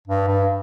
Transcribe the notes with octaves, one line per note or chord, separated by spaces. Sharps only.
G2
G2